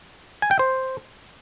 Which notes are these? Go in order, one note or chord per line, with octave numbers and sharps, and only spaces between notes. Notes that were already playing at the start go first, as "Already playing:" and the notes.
G#5
G5
C5